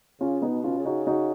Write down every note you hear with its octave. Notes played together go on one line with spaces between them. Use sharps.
C#3 C#4 F4
B3 D#4
B2
C#4 F4
C#3
D#4 F#4
D#4 F#4